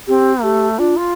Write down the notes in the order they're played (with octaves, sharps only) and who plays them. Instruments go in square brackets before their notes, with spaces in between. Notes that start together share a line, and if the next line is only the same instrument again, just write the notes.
[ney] C4 [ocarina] G4
[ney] A3 [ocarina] G4
[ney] D4 [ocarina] F4
[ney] F4